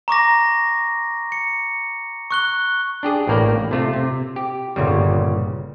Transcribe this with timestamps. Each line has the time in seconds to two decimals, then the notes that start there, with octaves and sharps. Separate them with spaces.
0.08 A#5 C#6 D6 A#6
1.32 C#7
2.31 C#6 F#6 G7
3.03 D4 G4 G#4
3.27 A1 A2 A#3 A#4 D5 G5
3.71 C3 A3 F4
3.93 C3
4.36 G4
4.76 G1 A#2 C#3 G3